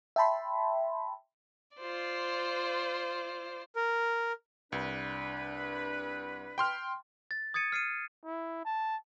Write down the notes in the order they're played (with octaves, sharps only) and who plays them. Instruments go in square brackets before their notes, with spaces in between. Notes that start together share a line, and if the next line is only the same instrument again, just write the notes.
[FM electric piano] E5 G5 A5 B5 C6
[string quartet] F4 C5 D5
[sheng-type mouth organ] A#4
[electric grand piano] C2 [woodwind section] D4 B4
[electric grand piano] G5 C6 F6
[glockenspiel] A6
D#6 G#6 A6 C#7 D#7
F6 C7 C#7 D#7
[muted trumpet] E4
A5